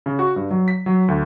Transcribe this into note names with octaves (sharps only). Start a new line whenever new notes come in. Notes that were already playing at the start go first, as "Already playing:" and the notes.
C#3
F#4
G2
F#3
B6
F#3
D2